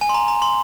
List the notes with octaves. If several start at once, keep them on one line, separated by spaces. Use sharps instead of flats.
G#5
C6
A#5
A#5
C6